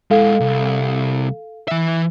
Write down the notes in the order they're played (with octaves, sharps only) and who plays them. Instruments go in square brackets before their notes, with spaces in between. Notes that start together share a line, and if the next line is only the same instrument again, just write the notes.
[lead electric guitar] G#3 E4 [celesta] A4 F5
[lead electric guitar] C2
E3 E5